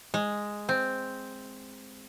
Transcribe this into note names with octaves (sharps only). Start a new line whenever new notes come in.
G#3
C4